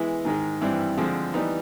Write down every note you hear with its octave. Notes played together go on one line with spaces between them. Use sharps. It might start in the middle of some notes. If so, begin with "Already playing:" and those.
Already playing: E3 G#3 B3 E4
G#2 D#3 G#3
G2 E3 G3 C4 E4
D3 F3 G#3 C4
E3 G3 B3 D#4